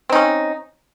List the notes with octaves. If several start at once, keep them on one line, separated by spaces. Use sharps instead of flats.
C4 C#4 D#4